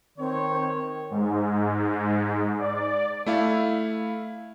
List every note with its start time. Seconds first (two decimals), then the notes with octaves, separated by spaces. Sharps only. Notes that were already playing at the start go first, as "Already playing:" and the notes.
0.18 D#3 C4 C#5
1.11 G#2
2.59 D5
3.26 A3 E4 F5